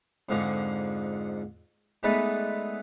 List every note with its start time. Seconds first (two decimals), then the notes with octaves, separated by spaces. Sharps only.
0.29 F2 G#2 D3 F3 A#3
2.03 G#3 A3 B3 D#4 B4 D5